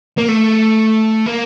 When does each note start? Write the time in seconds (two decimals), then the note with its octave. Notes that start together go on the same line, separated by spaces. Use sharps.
0.18 A#3
0.29 A3
1.26 A#3